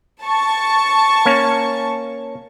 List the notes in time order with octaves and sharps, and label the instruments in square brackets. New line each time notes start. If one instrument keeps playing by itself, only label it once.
[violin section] A5 C#6
[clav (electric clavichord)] A#3 C#4